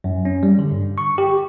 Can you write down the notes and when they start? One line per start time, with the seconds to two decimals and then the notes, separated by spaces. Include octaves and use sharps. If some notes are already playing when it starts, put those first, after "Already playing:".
0.04 F#2
0.25 C#4
0.43 G3
0.59 D3
0.71 G2
0.98 C#6
1.18 G4